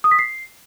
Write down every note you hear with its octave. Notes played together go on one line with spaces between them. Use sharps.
D#6
B6
C7